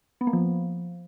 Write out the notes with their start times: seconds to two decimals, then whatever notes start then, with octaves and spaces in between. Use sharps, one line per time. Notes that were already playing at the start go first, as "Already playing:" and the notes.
0.21 B3
0.27 A#3
0.33 F3